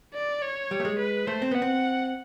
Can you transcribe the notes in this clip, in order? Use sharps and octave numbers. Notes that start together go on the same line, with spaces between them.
D5
C#5
G3
A3
G#3
B4
A3 C5
C4
B3 F#5
C4